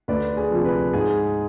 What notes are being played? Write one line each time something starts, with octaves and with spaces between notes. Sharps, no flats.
D2 B4 D5
G#4
C3 F3
B4
G#2 G#4